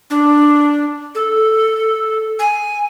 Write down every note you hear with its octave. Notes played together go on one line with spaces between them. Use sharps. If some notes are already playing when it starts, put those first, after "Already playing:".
D4
A4
G#5